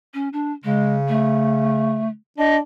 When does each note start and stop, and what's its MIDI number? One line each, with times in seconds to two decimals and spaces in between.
0.14 0.29 61
0.33 0.52 62
0.64 2.12 49
0.64 0.95 56
1.08 2.08 57
2.38 2.59 62
2.38 2.56 75